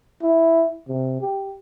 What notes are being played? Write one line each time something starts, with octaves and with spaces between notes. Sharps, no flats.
E4
C3
G4